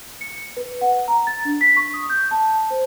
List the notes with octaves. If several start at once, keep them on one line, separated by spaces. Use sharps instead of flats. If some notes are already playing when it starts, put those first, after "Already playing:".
C#7
B4
F#5
A#5
A6
D4
B6
C#6
D#6
G6
A5
C5